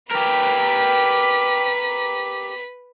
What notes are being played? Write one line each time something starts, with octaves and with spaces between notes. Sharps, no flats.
G4 A#4 B4 B6